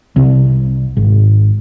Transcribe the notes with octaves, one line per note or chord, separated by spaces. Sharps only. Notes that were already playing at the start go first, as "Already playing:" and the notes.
C2
G#1